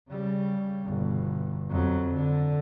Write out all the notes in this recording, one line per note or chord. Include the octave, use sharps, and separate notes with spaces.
C#3 G3
G1 B2
F2 F#3
D3